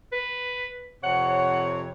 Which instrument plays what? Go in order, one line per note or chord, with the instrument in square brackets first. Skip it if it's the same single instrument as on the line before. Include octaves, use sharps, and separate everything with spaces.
[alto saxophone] B4
[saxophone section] F2 C3 C#5 [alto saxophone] F#5